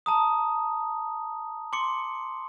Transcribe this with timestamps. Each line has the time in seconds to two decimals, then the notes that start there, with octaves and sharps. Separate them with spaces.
0.06 A5 A#5 D#6
1.73 C6 D6 C#7